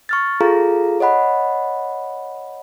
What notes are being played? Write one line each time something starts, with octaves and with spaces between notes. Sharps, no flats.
C#6 F6 A6
F4 G#4 A4 F5 A#5
C#5 D#5 F#5 B5